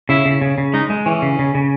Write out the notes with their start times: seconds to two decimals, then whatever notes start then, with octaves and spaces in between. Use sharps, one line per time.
0.09 C#3 E4
0.26 C#3
0.41 C#3
0.58 C#3
0.74 G#3 D#4
0.90 G#3
1.06 E3 C#4
1.22 C#3
1.39 C#3
1.55 C#3